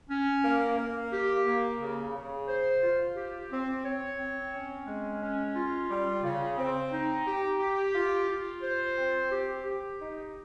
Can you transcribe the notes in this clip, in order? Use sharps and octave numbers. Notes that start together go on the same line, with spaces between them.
C#4
A#3
A#3
G4
A#3
C#3
C#3
C5
F4
G4
C4
C#5
C4
C#4
G#3
C#4
F4
G3
C#3
C4
D#4
G4
G4
F4
F4
C5
C4
G4
G4
D#4